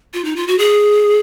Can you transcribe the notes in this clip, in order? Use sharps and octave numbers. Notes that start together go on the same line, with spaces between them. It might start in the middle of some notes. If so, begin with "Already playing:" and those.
F4
D#4
F4
F#4
G#4